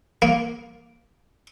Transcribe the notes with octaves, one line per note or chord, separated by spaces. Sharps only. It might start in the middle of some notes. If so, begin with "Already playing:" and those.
A#3